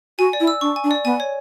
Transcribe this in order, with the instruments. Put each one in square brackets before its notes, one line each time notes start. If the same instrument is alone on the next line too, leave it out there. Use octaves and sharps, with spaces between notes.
[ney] F#4 [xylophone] G#5
[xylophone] D5
[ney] E4
[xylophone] E6
[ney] D4 [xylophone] C#6
[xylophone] G#5
[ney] D4
[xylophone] D5
[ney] B3 [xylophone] G#5
[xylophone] C#5